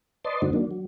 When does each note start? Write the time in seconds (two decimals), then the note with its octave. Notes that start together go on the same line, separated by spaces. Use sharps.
0.25 B4 D5 D#5 A5 C6
0.42 G2 D3 A3 C4 D#4 F#4
0.53 D#3 F#3 A#3 D4
0.71 F#3